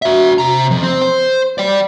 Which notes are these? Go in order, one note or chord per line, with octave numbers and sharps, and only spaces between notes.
F#4 E5
C3 A#5
F2
C4
C5
D5 G5